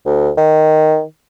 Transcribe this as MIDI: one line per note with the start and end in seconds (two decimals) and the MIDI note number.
0.06 0.30 38
0.37 1.02 51